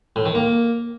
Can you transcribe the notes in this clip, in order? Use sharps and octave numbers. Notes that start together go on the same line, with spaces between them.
A2
D#3
A#3